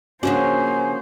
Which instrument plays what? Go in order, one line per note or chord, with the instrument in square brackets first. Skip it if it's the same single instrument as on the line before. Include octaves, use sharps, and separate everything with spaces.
[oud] C#3 F3 D4 [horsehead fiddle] A#3 C5 [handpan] C#4 F#4 [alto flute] G#5